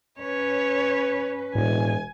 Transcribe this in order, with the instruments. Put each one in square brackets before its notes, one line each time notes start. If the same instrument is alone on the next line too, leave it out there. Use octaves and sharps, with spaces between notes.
[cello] C#4 B4 [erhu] C#5
[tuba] E1 [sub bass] A2 [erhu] G#5